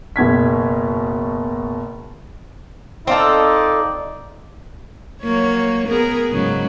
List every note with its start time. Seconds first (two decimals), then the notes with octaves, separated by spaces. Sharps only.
0.16 F#1 B2 G#6 B6
3.07 C4 D#4 F4 A4 D5
5.22 F#3 A#3 C#5
5.88 B3 G#4 A#4
6.31 G#2 C#3 F#3